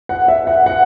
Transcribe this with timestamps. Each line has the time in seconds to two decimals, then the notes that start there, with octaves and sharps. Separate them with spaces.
0.09 F#5
0.28 E5
0.47 F#5
0.66 F#5